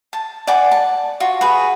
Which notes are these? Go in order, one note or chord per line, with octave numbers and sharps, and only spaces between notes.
A5
D5 F#5 G#5 D6
A5
F4 F#4
F#4 G#4 B4